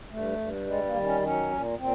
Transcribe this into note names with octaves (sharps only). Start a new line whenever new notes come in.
G2 A3
G2
G3 G#3
A#3
D#3
C#4
F#3 C#4
A#2
A#2 C4